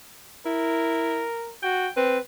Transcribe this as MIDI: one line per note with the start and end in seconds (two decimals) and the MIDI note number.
0.46 1.24 64
0.46 1.54 70
1.63 1.88 66
1.63 1.90 79
1.97 2.19 60
1.97 2.19 71